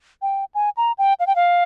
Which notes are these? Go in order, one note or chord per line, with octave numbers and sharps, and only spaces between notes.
G5
G#5
A#5
G5
F5
G5
F5